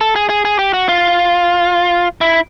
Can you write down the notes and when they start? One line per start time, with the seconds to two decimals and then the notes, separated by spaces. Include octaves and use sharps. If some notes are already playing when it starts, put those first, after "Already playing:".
0.01 A4
0.16 G#4
0.29 G#4
0.45 G#4
0.59 G4
0.73 F#4
0.89 F4
2.21 E4